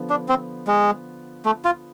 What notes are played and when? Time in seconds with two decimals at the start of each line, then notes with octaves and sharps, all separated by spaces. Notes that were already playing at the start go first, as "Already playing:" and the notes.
Already playing: D3 F3 B3
0.10 D4
0.29 C4
0.67 G#3
1.45 A3
1.65 F4